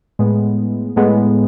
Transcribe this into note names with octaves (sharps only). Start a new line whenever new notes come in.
A2 G#3 B3
A2 G#3 B3